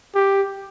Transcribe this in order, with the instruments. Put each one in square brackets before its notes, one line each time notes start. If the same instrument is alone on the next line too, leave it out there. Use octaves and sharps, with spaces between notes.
[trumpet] G4